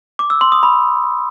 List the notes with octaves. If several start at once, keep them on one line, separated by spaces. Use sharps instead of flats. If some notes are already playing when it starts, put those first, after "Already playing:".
D6
E6
C6
D#6
B5